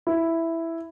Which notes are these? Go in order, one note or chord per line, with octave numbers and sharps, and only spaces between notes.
E4